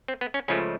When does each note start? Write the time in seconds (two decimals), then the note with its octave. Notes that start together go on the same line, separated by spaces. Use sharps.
0.08 C4
0.21 B3
0.34 C#4
0.48 C#2 C#3 F3 A3 C#4